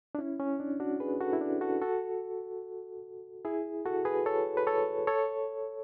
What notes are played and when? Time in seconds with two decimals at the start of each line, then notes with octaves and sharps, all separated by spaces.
0.15 D4
0.18 C#4 E4
0.40 C#4
0.60 D4
0.80 D4 F#4
1.00 G#4 B4
1.20 F#4 A4
1.33 E4
1.41 D4
1.61 F#4 A4
1.82 F#4 A4
3.45 E4 G#4
3.86 F#4 A4
4.05 G#4 B4
4.26 A4 C#5
4.57 B4
4.67 A4 C#5
5.07 A4 C#5